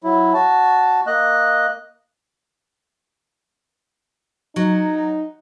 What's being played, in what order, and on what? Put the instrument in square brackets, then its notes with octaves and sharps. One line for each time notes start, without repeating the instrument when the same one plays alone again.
[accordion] F#3 E4
F#4 A5
A#3 D#5 F#6
[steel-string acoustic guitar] F#3 [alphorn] D#4